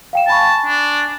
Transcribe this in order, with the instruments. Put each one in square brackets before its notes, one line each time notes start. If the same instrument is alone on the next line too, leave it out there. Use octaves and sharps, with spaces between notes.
[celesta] F5 G5 E7
[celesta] G#5 B5 C#6 [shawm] A5
[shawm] D4